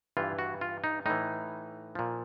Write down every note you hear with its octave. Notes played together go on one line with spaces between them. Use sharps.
G2 E3 F4
F#4
F4
D#4
A2 E3 D#4
A#2 F3